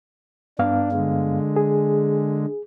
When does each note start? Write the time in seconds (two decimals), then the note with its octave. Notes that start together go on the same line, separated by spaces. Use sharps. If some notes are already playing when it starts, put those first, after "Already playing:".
0.59 G2 B3 D4 F5
0.92 D3 G#3
1.56 G#4